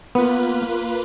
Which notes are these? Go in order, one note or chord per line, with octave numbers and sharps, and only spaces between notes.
A#3 B3 F4 B4